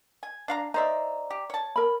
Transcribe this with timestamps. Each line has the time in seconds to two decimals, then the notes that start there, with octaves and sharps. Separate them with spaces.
0.23 G#5
0.48 D4 F5 A#5
0.74 D#4 C5 D5 E5 A#5
1.30 G4
1.50 C#5 A5
1.76 A#4 B5